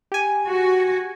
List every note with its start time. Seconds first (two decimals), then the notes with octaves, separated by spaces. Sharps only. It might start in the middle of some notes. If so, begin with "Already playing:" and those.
0.12 G4 G#5
0.48 F#4